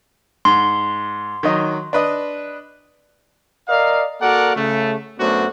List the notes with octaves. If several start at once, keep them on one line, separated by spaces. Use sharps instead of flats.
G#2 C6
D#3 F#3 D#5
D4 B4 D#5
A#4 D5 D#5 F5
A#3 F#4 A4 A#4 D5 F#5
C#3 A3
F#2 A3 B3 D4 F#4 C5